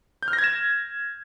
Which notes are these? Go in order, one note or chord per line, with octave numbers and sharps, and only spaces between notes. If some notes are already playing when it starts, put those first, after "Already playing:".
G6
F6
A#6
G#6
E7